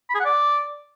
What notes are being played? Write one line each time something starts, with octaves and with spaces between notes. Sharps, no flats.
B5
G#4
F#5
D5